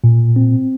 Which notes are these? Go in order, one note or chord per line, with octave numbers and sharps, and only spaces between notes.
A#2
C4